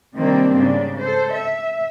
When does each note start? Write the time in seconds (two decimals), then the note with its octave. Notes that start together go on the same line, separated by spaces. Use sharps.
0.16 C3 D#3 G3 A#3 C4 D4
0.55 G#2 C#3 D4
1.00 A4 C5
1.33 E5